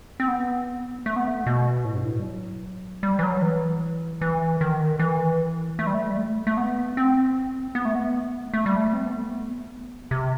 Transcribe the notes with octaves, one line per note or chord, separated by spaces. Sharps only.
C4
B3
A3
B3
A3
B2
A2
G2
A2
G3
F#3
G3
E3
F#3
E3
E3
D#3
E3
A3
G3
A3
G3
A3
A3
B3
C4
B3
A3
B3
A3
G3
A3
C4
B3
A3
B3
C3